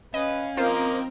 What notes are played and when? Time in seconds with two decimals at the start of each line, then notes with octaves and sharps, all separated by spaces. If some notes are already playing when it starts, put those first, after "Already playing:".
0.14 C#4 B4 D#5 F5
0.57 F3 A#3 C4 D#4 F4 A#4 C5